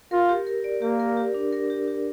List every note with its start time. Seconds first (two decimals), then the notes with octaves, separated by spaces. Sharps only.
0.11 F4 A#4
0.29 G4
0.47 A#4
0.64 D5
0.82 A#3 G4
1.00 A#4
1.17 G4
1.34 D4
1.53 A#4
1.70 G4
1.88 G4